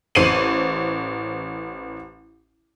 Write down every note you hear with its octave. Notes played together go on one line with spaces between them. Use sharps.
A1 C5 C7 D#7 F#7